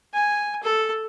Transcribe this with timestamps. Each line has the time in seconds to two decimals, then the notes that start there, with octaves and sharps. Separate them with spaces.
0.14 G#5
0.63 A4